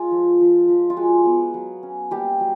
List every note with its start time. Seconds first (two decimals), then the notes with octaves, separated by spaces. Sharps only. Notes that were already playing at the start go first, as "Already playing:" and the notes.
Already playing: G#3 F4
0.11 F3
0.40 F3
0.68 F3
0.90 F4
0.97 G#3 F#4
1.25 B3
1.54 F#3
1.83 C#4
2.11 G3 A#3 G4
2.40 F#3